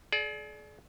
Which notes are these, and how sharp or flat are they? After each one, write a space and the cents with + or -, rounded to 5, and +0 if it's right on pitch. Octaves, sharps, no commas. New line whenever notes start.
G#4 +40 D5 +0